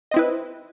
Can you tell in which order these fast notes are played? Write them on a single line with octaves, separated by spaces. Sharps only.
D#5 C4 E4 B4